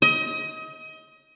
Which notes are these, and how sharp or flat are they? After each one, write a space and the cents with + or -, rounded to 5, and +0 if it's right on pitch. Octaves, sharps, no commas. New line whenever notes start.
D#5 +30